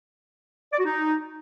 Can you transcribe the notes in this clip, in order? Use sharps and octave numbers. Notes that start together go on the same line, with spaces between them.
D5
F#4
D#4